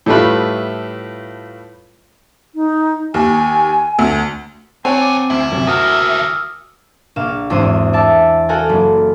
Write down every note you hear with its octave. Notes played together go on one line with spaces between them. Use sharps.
A2 G3 A3 F4 B4
D#4
D#2 G#5
D2
F2 C4 C#5 F#5 G#5 A5
D6 A6
D2 E4
F#2 C3
D#2 E4 F#4 A#4 D#6 F6
E6
A#1 A#2 F5 E7
G#1 E2 G#2 D4 C5 D#6
D5 E5 A5
F#4 A4 A#4 F5 F#5 G#5
F#1